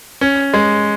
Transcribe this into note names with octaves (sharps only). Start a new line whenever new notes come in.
C#4
G#3